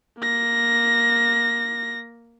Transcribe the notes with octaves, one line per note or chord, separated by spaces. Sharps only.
A#3 A#6